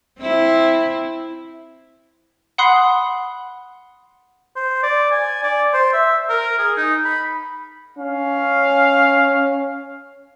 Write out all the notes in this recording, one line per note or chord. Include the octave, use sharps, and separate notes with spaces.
C4 E4
F#5 B5 C6 D#6 F#6 C7
C5
D5
G#5
D5
C5
E5
A#4
G#4
D#4
B5
C#4 F5